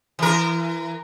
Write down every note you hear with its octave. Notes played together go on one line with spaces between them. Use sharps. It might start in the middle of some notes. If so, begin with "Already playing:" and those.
E3 A#4